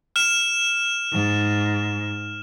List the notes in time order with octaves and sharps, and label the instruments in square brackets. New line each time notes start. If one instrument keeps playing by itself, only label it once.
[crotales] F6 E7
[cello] G#2